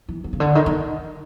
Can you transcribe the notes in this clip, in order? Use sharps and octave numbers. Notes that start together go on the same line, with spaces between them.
E3
D3
C#3
D3
D#3
D#3